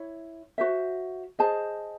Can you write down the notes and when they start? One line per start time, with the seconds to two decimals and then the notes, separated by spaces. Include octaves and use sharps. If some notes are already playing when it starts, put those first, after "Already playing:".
Already playing: E4 C#5
0.58 F#4 C5 E5
1.39 G#4 C5 D#5 A5